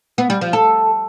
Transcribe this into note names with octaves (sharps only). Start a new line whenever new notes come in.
B3
G3
F3
A4